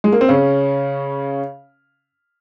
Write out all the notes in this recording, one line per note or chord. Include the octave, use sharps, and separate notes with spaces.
G#3
A#3
C4
C#3 C#4